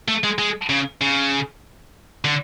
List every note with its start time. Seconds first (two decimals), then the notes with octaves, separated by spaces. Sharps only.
0.08 A3
0.24 G#3
0.39 G#3
0.69 C#3
1.01 C#3
2.24 D3